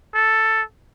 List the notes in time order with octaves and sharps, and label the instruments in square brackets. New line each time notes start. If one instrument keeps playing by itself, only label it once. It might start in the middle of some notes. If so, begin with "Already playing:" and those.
[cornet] A4